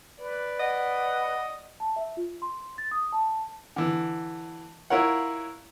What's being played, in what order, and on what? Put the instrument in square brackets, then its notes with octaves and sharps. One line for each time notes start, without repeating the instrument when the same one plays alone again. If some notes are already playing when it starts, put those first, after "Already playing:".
[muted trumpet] B4 [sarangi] D5
[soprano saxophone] D#5 [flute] F#5
[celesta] A5
E5
F4
C6
A6
D#6
A5
[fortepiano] D3 E3
E4 F4 A#4 C#5 F#5